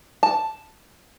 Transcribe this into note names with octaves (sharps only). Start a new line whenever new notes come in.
A5